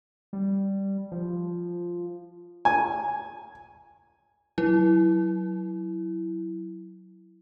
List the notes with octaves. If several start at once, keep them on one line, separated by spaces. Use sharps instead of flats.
G3
F3
G#5
F#3 E4